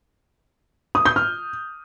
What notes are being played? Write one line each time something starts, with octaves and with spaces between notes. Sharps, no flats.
D#6
G6
F6